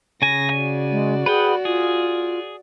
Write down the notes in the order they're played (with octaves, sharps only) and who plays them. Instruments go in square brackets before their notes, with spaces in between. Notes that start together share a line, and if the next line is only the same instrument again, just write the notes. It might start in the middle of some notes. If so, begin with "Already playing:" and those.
[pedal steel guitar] C#3 G#5 [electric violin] A#6
[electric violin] F#4 D5
[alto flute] G#3
[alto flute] G#4 [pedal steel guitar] B4 F#5 G5
[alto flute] F4 [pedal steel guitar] G#4